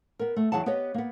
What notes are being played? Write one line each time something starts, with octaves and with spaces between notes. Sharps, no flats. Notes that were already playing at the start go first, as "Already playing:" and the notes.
B3 A#4
A3
E2 E3 F#3 G#4 F#5 A5
B3 G4 B4 C#5 D#5
A#3 B3